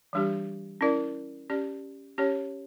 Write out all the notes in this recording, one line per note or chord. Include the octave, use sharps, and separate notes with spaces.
E3 G3 D4 G4
C#4 E4 A#4 D5
C#4 G4 D5
C#4 G4 C#5